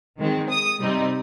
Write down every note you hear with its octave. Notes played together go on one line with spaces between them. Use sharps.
D#3 G#3 C4
D#6
C3 G3 C4 D#4